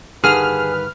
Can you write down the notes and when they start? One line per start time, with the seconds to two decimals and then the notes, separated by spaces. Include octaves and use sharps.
0.24 G2 D3 D#3 G#4 B4 F6